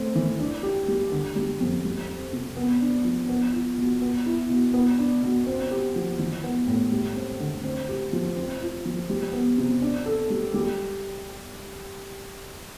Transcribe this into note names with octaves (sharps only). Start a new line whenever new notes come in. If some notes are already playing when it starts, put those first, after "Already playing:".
Already playing: A3 C4
E3
D4
G4
G3
D3
G3
F2
G3
C4
C3
B3
D4
F3
B3
F4
B2
B3
E4
B2
B3
D4
B2
C4
G4
F3
E3
B3
A2
G3
C4
D3
C4
G4
F3
C4
F4
F3
G3
B3
C3
D4
A4
G3
G3